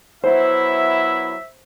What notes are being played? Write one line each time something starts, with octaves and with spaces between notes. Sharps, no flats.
F#3 B3 E4 C5 E5